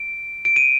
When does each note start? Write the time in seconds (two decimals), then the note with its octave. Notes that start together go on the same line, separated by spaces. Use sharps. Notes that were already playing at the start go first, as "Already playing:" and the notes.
Already playing: D7
0.45 D7
0.56 D#7